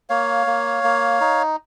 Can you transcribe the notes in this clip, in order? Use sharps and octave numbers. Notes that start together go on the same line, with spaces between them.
A#3 C#5 F5
A#3
A#3
D#4